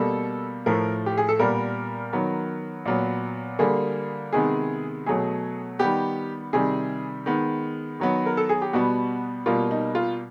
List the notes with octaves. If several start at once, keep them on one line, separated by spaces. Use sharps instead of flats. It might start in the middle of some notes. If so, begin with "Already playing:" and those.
Already playing: B2 G3 A#3 A4
A2 F3 A3 A#4
G4
G#4
A4
A#2 G3 B3 A#4
D#3 F#3 B3
A#2 F#3 B3
D3 G3 A#3 G#4
C3 D#3 G#3 B3 G#4
B2 F#3 A3 G#4
D#3 G3 B3 G4
C3 D#3 G3 G#4
D#3 G#3 B3
D#3 F#3 B3
A#4
A4
G#4
G4
B2 G3 B3 F#4
B2 G3 A#3 F4
D#4
F4